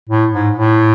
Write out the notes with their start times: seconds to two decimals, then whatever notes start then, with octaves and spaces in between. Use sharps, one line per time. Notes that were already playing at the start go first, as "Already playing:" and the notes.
0.09 A2
0.33 G#2
0.56 A2